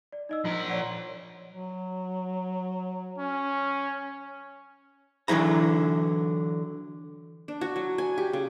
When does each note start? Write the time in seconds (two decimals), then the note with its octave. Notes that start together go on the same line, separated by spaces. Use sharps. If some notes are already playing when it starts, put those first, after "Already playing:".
0.13 D5
0.29 D#4 D#5 E6
0.45 F3 F4 A#4
0.69 C#5 D5 F#5
1.52 F#3
3.18 C#4
5.28 D3 E3 F#3 E4 A#5
7.48 D4
7.61 F#4
7.76 F#3
7.98 G#5
8.18 G4
8.33 C#3